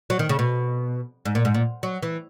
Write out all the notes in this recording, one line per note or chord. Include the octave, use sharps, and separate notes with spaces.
F#3
D#3
C#3
B2
G#2
A#2
G#2
A#2
F#3
E3